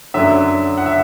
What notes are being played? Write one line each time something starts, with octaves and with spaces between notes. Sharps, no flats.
F#2 D3 F#3 E5
F#5
E5